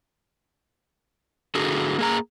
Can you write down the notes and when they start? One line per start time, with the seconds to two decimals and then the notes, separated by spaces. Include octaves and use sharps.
1.55 D3 F#4 G#4
1.98 A#3 G#4 A#5